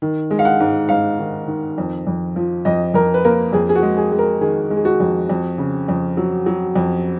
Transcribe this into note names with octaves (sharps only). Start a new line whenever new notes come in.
D#3
G#3
F5
F#5
G#2
G#2 F5
D#3
D#3
F2
F2
F3
F2 D#5
F2 A#4
B4
A#3 A#4
F2 G#4
G#4
F#4
G#3
G#4
G#3
A#4
D#3 G#4
G#3
G#4
F#4
F2
F2
C#3
F2
F#3
F#3
F2